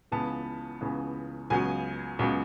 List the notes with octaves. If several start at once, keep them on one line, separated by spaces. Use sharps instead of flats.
C#2 C#3 E3 B3 A5
C#2 C#3 E3 B3
C#2 C#3 F#3 B3 G#5
C#2 C#3 F#3 B3